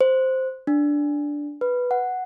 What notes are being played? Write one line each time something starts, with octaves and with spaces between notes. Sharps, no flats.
C5
D4
B4
F#5